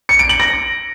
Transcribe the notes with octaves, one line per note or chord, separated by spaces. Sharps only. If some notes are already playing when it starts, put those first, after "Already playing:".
C#7
D7
F#7
A#6